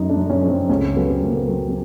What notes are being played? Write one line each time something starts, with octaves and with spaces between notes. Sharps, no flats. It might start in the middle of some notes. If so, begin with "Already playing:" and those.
Already playing: F#2 D#4
D4
F#2
C#4
F3
C4
C#2 C#4
C4
F#3 B3
C4
C#2 A#3
B3
F#3 C4
C4